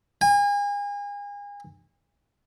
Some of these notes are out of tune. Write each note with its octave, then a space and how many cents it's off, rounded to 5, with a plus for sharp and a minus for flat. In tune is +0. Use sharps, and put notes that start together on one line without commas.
G#5 -35